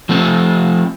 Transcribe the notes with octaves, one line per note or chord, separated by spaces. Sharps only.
F3 A3 C4